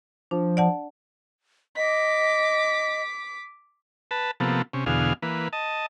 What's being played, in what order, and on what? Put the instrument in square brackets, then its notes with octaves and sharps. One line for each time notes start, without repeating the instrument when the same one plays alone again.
[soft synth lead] F3 [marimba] D4
[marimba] D5 F#5 A5
[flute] D#5 [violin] D6 B6
[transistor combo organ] B4 A5
C3 F3 A#3 B3 A4
C3 C#4
E2 B2 D3 G#4 F5
E3 A#3 B4
D#5 A5